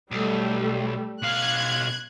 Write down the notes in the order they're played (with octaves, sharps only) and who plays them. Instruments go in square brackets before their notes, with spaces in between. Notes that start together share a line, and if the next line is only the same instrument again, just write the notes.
[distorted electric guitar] B1 [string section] G3 A3
[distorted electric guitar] B1 F5 [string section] F#6 G#6